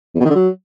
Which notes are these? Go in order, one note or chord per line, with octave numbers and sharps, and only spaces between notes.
E2
B2
D#3
D3
F#3